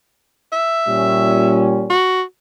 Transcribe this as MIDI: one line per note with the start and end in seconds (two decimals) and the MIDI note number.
0.52 1.68 76
0.87 1.93 46
0.87 1.93 55
0.87 1.93 61
1.90 2.22 66